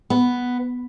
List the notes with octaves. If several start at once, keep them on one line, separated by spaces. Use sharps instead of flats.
B3